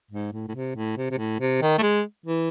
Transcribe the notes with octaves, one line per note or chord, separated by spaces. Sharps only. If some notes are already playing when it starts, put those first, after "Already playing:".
G#2
A2
A2
C3
A2
C3
C3
A2
C3
D#3
A3
G#3
E3